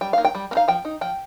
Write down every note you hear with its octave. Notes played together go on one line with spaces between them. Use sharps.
G3 G5
A#3 D#4 F5
G5
G3
A#3
D#4 F5
F3 G5
D#4
F3 G5